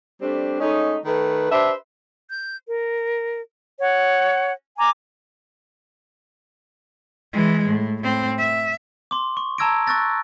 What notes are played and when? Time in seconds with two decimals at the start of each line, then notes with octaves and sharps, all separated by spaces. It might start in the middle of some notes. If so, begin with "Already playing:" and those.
0.21 G3 A3 C4 D4
0.60 G#3 A3 C#4 D#4
1.05 D#3 A3 B4
1.51 D4 G4 B4 C5 E5
2.30 G6
2.68 A#4
3.78 C#5 F#5
4.78 G#5 A#5 D6
7.33 E3 G#3
7.68 A2
8.02 A2 C4
8.39 E5
9.11 C6 D6
9.37 C#6
9.58 A5 A#5 E6 G#6 A#6 D7
9.87 C#6 E6 F#6 A6 A#6